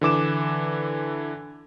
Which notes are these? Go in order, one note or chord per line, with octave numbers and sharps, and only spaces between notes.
D3 E3 D6 E7